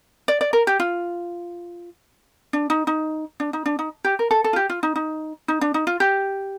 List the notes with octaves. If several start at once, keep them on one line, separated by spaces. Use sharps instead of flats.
D5
D5
A#4
G4
F4
D4
D#4
D#4
D4
D#4
D4
D#4
G4
A#4
A4
A4
F4
G4
F4
D#4
D#4
D#4
D4
D#4
F4
G4